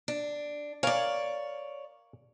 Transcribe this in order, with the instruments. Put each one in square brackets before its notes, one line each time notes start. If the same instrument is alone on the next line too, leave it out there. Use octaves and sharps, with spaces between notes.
[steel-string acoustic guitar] D4
[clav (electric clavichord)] A#4 F5 G#5 [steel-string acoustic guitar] C#5 D5